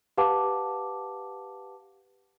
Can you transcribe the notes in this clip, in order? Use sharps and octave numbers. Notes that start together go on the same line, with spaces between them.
G4 B4 F5 F#5 A5 D6